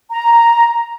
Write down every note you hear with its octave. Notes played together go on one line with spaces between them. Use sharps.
A#5